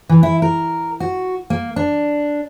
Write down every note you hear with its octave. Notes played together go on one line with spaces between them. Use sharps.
E3
E4
A#4
F#4
A#3
D4